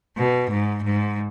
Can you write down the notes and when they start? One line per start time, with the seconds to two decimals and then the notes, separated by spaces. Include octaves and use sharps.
0.18 B2
0.50 G#2
0.83 G#2